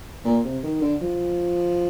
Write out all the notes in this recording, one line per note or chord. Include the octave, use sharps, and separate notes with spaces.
A#2
C3
D#3
D3
F3